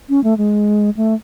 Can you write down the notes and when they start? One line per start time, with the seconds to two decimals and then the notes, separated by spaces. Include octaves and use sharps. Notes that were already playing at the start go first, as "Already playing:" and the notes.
0.09 C#4
0.24 A3
0.38 G#3
0.97 A3